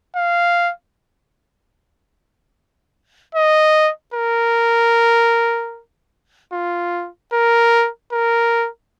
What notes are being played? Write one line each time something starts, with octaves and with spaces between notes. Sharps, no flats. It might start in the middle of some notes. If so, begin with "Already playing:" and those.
F5
D#5
A#4
F4
A#4
A#4